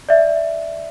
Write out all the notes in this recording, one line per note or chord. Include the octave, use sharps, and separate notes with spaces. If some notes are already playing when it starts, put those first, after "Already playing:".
D5 E5